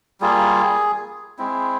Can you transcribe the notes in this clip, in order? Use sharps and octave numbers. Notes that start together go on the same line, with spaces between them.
G3 A#3 F4 G#4
G#3 C4 E4